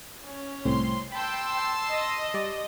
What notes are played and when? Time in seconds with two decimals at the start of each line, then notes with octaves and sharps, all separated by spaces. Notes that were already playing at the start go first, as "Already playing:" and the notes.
0.24 C#4
0.65 C2 A2 C4 C6
1.12 G5 A5 B5 C6 E6
1.90 D#5
2.34 G3 D5